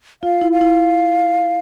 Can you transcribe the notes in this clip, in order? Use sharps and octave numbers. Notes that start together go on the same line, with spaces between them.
F4 F5
E4
F5
E4